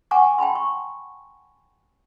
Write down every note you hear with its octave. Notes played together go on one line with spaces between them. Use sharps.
F#5 G#5 A#5 C#6 D6
G5 A5 B5 C6
C#6